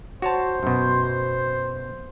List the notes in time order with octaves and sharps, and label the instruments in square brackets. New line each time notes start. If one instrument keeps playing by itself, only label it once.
[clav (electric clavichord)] F#4 C#5 A5 [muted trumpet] C5
[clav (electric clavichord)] F#2 B2